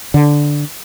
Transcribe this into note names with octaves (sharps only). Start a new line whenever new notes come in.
D3